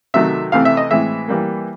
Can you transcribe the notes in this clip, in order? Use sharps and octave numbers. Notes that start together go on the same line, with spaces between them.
C3 D#3 F#3 A3 E5
C3 E3 A3 C4 F5
E5
D#5
A2 E3 G#3 C4 E5
E3 G3 A#3